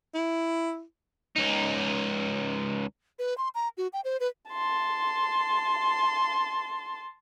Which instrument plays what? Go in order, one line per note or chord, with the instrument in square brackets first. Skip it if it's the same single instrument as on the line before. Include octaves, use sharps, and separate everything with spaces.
[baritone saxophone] E4
[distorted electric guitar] C#2 D#4
[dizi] B4
C6
A#5
F#4
G5
C5
B4
[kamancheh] A5 C6